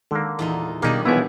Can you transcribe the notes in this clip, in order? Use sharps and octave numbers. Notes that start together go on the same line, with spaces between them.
D3 D#3 G#3 A#3 A4
E2 A#2 D#4
B2 D#3 G3 A#3 D4 D#4 G#4
B1 E3 F3 B3 E4 G#4 C#6 E6